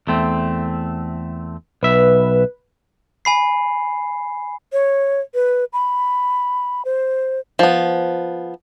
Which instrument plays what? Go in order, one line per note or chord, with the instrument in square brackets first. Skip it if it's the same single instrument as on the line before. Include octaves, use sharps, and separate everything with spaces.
[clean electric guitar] E2 A3 C4
[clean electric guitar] B1 E5 [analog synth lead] B4
[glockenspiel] G#5 B5 C7
[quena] C#5
B4
B5
C5
[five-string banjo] F3 B3